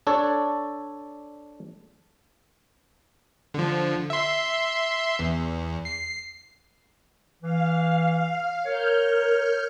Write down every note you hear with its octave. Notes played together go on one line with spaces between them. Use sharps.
D4 A4 C#5 D5
D3 F3
E5 C6
E2
C7
E3 F5
A#4 C#5 F6 G6